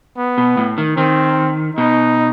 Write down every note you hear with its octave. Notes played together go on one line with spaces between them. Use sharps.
B3
B2
A2
D#3
D#3 C4
B2 D#4